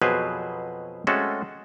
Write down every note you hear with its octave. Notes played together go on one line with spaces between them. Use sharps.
F2 B2 F#3 G#4 B4 C5
G#3 A3 C4 C#4 F#4 A4